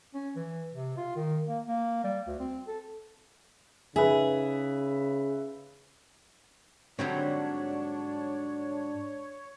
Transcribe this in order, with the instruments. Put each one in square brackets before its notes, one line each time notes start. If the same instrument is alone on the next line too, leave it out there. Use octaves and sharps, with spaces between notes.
[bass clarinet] C#4
E3
C3
F4
D#3
A#3
A#3
G3
D2
C4
A4
[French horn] C#3 [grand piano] D#4 B4 E5 [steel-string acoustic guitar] G#4
[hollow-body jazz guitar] G#2 C4 [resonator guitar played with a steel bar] D3 F#3 G3 [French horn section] D4 [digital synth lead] C#5